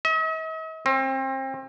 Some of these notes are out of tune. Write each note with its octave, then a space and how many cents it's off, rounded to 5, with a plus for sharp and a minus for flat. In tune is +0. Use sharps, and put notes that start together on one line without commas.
D#5 +45
C4 +30